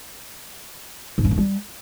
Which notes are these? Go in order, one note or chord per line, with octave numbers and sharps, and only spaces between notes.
G#2
G2
F#2
G3